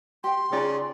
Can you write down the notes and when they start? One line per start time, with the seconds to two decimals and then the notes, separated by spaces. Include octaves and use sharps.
0.24 G4 G5 C6
0.52 C#3 D#4 F4 D5